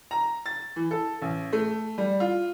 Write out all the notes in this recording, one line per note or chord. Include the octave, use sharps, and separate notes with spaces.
A#5
A6
E3
A4
A1
A3
G3
F4